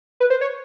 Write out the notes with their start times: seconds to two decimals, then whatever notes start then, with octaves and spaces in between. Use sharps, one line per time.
0.20 B4
0.30 C5
0.41 C#5